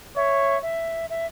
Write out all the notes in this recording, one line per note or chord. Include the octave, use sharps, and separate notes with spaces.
C#5 E5
E5
E5